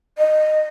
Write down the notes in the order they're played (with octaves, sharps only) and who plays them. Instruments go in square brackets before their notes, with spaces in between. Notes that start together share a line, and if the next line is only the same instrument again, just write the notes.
[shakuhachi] D#5